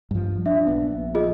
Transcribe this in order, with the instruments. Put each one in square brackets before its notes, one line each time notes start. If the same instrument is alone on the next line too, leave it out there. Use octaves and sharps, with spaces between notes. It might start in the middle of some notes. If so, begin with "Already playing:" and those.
[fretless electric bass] G2 F3
[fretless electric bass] D4 [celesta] E5
[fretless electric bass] A#1 B3
[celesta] F4 G#4 D#5